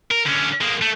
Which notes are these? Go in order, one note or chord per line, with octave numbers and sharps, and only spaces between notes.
A#4
D3 C#4
G#3 A#3
A3